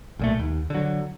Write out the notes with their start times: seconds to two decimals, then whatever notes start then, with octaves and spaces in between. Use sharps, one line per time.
0.19 B1 A#2 A3
0.39 D#2
0.70 D3 F#3